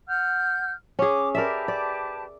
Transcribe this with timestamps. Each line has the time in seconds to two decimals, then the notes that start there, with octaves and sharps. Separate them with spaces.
0.06 F#5 F6 G6
0.99 C#4 G#4 D6
1.35 G4 A#4 B4 D5 E5 A5
1.68 D5